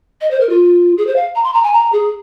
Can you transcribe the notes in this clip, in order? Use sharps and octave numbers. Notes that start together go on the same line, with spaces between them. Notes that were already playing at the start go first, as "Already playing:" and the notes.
D#5
C5
A#4
F4
G#4
C5
F5
A#5
C6
A#5
G#5
A#5
G#4